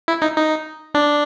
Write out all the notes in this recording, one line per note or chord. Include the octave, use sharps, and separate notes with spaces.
E4
D#4
D#4
D4